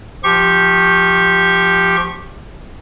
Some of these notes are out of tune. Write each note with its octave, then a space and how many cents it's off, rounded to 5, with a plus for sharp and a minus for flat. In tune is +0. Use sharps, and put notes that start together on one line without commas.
F3 +0 G4 +0 C#6 -25